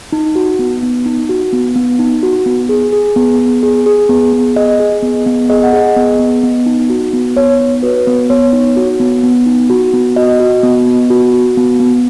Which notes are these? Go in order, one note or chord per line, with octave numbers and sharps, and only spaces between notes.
D#4
F#4
B3
B3
D#4
F#4
B3
B3
D#4
F#4
B3
G#4
G#4
B3
B3
G#4
G#4
B3
B3
G#4 D#5
G#4
B3
B3
G#4 D#5
F#5
G#4 D#5
B3
B3
B3
D#4
F#4
B3
B3 C#5
D#4
F#4 B4
B3
B3 C#5
D#4
F#4
B3
B3
D#4
F#4
B3
F#4 D#5
F#4
B3
B3
F#4
F#4
B3
B3